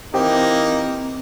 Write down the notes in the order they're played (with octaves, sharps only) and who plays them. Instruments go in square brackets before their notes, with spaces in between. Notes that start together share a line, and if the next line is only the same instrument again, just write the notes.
[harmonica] E3 A#3 D#4 [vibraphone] C4 [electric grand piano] G4 C5 G5